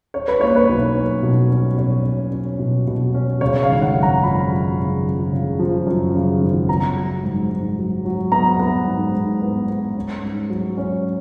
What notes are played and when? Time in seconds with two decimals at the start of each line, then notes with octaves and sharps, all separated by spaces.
0.14 C#4 C#5
0.28 B4
0.41 A#3 C#5
0.56 B4
0.69 B1
0.96 C#4
1.23 B2
1.51 C#4
1.78 B2 C#5
2.06 C#4
2.32 C#4
2.59 B2
2.87 B2
3.14 C#4
3.41 C#3 C#5
3.63 F5
3.69 G#1
3.82 F#5
3.96 F#2
4.03 A#5
4.23 F3 B5
4.51 F#2
4.77 C#3
5.05 F3
5.32 C#3
5.59 F3
5.86 F#2
6.14 C#3
6.41 G#1
6.68 B3 A#5
6.96 F#3
7.23 G#2
7.51 G#2
7.78 F#3
8.05 F#3
8.32 B3 A#5
8.59 B3
8.87 G#2
9.15 G#2
9.42 B3
9.69 B3
9.96 C#4
10.23 G#2
10.50 F#3
10.77 C#4